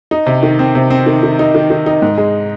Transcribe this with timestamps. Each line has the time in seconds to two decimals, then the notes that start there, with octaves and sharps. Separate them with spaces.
0.11 D#4
0.27 C3
0.43 D#3
0.59 C4
0.75 C3
0.90 C4
1.06 D#3
1.23 D#3
1.39 D#4
1.55 D#3
1.70 D#3
1.86 D#4
2.02 G#2
2.18 G#3